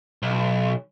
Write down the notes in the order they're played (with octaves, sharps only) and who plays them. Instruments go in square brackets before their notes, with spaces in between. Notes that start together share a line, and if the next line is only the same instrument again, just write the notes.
[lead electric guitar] B1